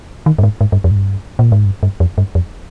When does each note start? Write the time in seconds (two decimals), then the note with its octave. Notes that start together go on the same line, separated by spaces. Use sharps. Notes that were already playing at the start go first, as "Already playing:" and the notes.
0.26 D#3
0.39 G2
0.43 G#2
0.61 G#2
0.72 G2
0.84 F2
0.91 G#2
0.96 G2
1.39 A#2
1.52 G#2
1.65 G2
1.83 G2
2.00 F2
2.18 G2
2.35 F2